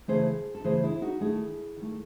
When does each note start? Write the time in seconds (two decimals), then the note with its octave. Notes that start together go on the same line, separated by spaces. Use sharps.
0.08 C#3 E3 A3 G#4 C5
0.55 A4
0.64 C#3 E3 A3 G#4 C5
0.83 E4 G#4
1.01 D#4 F#4
1.20 D#3 A3 E4 G#4
1.77 D#3 A3